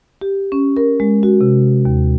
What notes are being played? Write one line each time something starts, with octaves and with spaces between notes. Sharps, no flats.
G4
C#4
A#4
G#3
F#4
C3
D#2